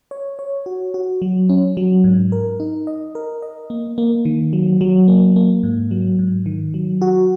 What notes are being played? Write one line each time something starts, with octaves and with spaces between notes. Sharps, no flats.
C#5
C#5
F#4
F#4
F#3
C#4
F#3
G#2
A#4
D#4
D#5
A#4
D#5
A#3
A#3
D#3
F#3
F#3
A#3
A#3
G#2
F#3
G#2
D#3
F#3
F#4